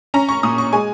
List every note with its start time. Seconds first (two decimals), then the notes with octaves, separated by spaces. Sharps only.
0.14 C#4 A#5
0.29 C#6
0.43 A#2 D#6
0.58 C#6
0.73 G#3 G#5